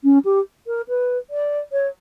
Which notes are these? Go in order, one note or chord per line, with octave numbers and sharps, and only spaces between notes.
C#4
G4
A#4
B4
D5
C#5